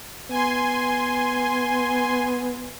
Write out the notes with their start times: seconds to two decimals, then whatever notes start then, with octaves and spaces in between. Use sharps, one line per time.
0.30 B3 G#5 C6